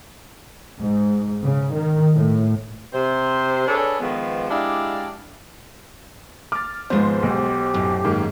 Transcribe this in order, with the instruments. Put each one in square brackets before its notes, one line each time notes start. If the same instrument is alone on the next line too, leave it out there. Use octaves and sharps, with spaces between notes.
[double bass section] G#2
C#3
D#3
A2
[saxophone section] C3 C5
D4 G#4 A4 B4 C#5 D5
D#3 F3 G#3 B3
G#3 D4 E4 G4 D5 F5
[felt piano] D6 A6 [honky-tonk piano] F6
[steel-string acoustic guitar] D#2 G#3 [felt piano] G#2 F3 B3 [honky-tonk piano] C5
[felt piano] B1 B2 [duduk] G4
[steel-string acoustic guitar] F#2 A2
[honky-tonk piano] G#2 A#3 [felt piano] D#3